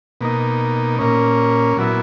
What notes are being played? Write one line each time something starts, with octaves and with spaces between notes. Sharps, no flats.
B2 A#3 D#4
A#2 A#3 C#4
A#2 F#3 B3 E4